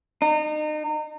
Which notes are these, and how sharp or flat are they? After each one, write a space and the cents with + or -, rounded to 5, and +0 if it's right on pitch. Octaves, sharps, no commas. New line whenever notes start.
D#4 -35